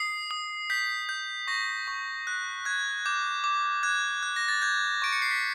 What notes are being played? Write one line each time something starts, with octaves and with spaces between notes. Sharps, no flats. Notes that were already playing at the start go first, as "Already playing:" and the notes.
Already playing: D#6 C7
D#6
G6 B6
G6
C#6 A#6
C#6
F#6
F#6 G#6
D6 G6
D6
F#6 G#6
F#6
A#6
A6
G6 G#6
C#6 D7
C#7
C7
B6